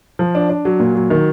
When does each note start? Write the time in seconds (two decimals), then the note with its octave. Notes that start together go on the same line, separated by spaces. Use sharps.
0.19 F3
0.35 D4
0.50 D4
0.65 F#3
0.80 A#2
0.95 F#3
1.10 D#3